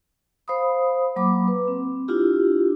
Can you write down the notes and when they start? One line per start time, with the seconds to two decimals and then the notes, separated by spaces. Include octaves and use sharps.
0.48 C5 F5 B5 D#6
1.16 F#3 A#3 B5 D6
1.48 B4
1.68 C4
2.08 D4 E4 F4 G4